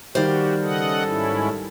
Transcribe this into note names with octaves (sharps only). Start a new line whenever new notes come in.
D#3 G3 F#4 G4 C5 D5 F5
C#3 A4 D#5 F#5
G#2 C#4 E4